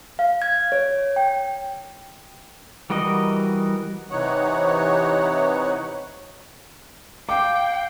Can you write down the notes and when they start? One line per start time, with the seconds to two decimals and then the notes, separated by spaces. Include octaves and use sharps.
0.19 F5
0.42 G#6
0.72 C#5
1.16 G5
2.90 E3 G3 F#4 A#4 D#5
4.10 C3 E3 D#4 C#5 F#5
7.29 F5 G5 D6